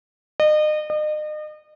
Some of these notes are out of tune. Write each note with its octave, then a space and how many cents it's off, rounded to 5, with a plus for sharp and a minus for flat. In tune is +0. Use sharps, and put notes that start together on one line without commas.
D#5 -35
D#5 -40